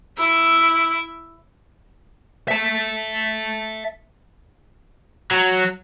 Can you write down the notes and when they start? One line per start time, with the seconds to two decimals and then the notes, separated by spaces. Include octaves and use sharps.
0.18 E4 E5
2.48 E5 A5
5.31 F#3